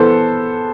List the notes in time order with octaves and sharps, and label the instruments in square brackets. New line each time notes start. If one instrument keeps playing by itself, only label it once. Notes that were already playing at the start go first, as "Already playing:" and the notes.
Already playing: [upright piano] E3 B3 A4 C5